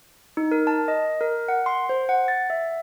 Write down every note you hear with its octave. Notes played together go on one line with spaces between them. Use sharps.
D#4
A#4
A5
D#5
A#4
F#5
C6
C5
F#5
A6
E5